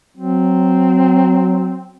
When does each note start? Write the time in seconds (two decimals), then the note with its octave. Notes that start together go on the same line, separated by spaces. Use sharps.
0.17 F#3 C4